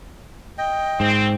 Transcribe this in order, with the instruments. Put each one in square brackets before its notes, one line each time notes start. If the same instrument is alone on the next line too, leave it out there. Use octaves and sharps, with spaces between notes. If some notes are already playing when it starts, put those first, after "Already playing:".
[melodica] D#5 G5
[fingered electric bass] G#2 [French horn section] C4